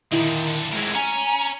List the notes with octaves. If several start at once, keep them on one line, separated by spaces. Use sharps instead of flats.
A#2 D3 D#3 E4
A2 G#3 C4 A#4
C#4 G#5 A#5